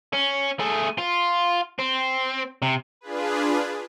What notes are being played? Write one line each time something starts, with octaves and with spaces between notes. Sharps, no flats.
C#4
A3 G#4
F4
C4
C3
D4 F4 G#4 B4